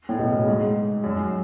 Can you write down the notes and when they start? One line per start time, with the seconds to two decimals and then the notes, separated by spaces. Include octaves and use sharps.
0.09 A2
0.19 B2
0.28 C#3
0.47 G#2
1.04 F#2